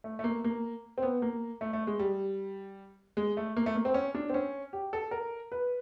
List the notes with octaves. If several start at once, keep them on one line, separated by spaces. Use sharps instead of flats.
A3
A3
A#3
A#3
C4
B3
A#3
A3
A3
G#3
G3
G#3
A3
A#3
A3
A#3
C4
C#4
D4
C4
C#4
G4
A4
A#4
B4